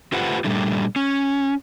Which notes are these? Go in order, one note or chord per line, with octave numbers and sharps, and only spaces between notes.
A3 F4 G4 B4 C5 F#5
A#2 G3 A3 D4
C#4